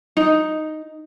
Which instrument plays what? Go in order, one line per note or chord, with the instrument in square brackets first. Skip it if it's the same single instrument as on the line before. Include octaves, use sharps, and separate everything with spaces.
[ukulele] D#4